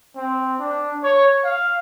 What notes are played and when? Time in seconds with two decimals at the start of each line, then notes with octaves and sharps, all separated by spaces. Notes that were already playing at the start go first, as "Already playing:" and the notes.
0.16 C4
0.60 D4
1.03 C#5
1.44 F5